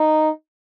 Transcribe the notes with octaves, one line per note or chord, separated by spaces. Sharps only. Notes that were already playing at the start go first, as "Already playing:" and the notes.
Already playing: D#4